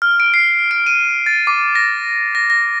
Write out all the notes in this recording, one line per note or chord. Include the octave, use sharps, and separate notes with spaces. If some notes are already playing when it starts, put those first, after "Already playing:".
F6
D7
C7
D7
D#7
A6
D6
A#6
A#6
A#6